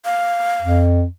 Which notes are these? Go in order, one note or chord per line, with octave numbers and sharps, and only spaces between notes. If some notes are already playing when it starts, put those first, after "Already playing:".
F5
F2